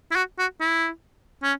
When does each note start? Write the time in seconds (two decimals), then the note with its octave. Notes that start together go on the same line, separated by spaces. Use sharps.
0.11 E4
0.16 F#4
0.39 F#4
0.61 E4
1.43 C#4